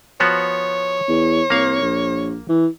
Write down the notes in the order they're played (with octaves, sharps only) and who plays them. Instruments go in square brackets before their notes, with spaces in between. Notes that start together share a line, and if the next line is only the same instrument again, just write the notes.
[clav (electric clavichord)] F3 B3 F#4 [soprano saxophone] C#5
[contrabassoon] E2
[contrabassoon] C2 [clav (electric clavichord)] A#3 F5
[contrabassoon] A#1
E3